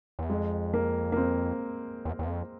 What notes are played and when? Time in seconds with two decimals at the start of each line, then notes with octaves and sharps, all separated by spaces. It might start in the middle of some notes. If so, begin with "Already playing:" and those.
0.19 E2
0.30 F2 G#3
0.74 A#3
1.12 A#3
1.17 C4
2.05 E2
2.19 E2
2.27 F2